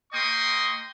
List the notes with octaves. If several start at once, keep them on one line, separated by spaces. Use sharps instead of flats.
A#3 D#5 G5 C6 C#6 D#6